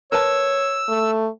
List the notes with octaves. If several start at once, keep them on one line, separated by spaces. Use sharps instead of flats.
A#4 B4 C#5 A5 E6
A3